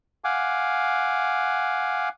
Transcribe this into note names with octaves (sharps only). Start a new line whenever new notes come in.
F5 F#5 G#5 D6